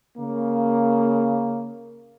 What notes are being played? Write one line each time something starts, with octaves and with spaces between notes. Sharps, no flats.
C#3 A#3